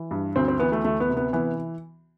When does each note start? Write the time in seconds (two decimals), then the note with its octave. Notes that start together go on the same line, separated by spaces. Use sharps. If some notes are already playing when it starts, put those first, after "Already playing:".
Already playing: E3
0.11 G2
0.36 D2 C4
0.48 C4
0.59 E3 B3
0.72 A3
0.84 D2 A3
1.00 B3
1.09 C3
1.17 B3
1.33 E3 B3